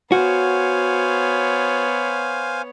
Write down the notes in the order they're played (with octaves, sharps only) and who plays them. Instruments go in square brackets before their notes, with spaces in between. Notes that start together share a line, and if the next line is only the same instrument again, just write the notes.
[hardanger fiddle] B3 C#5 [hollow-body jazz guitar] F#4 [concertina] C5 F5 G#5